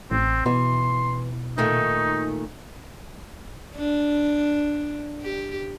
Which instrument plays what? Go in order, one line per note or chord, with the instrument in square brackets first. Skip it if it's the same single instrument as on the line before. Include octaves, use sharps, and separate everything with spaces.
[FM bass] A1 [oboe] C4
[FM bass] B2 [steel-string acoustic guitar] E3 [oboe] C6
[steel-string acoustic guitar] A#2 D#3 A3 [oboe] D#4
[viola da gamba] D4
G4